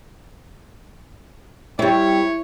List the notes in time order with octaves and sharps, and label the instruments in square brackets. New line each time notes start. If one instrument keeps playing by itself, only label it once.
[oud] G3 C4 [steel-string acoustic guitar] E4 [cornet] C#5